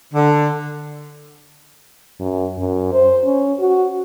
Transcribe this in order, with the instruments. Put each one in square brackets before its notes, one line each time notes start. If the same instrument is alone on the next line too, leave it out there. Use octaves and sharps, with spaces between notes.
[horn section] D3
[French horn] F#2
F#2
C5
C#4
F#4